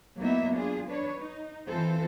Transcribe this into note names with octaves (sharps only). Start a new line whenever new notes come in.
F#3 A#3 B3 D#4 E4 E5
D4 F4 G#4
D4 B4 C#5
D#4
E3 C4 F4 A4 C5